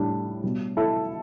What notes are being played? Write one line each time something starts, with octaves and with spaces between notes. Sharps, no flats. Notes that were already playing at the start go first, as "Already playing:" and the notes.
Already playing: A2 G3 D4 G4
B2 G3
E4 A4